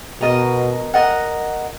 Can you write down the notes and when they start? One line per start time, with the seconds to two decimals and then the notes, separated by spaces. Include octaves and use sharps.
0.21 B2 A#4 D#5 A#5
0.94 A#4 D#5 F#5